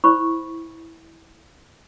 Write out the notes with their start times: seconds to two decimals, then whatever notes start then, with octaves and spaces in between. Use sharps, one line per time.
0.04 E4 C5 B5 C#6